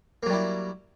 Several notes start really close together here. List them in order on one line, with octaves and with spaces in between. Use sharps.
A#3 F#3 G3 E4